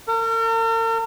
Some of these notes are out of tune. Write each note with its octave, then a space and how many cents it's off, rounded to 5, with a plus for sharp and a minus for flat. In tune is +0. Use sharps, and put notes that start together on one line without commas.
A#4 -45